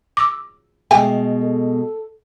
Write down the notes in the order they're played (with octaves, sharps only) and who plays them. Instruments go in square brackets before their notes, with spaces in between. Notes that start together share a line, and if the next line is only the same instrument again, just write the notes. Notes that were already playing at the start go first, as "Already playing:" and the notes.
[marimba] D6 E6
[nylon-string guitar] B2 G#3 [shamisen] A3 G4 G#5
[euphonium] A4